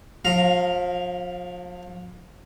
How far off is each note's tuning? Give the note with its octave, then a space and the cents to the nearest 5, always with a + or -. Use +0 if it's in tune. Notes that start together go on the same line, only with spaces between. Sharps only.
F3 +35 F5 +0 A#5 +0